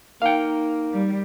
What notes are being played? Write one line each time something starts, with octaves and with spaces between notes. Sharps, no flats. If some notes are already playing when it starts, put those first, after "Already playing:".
A#3 D#4 F5 G5
G3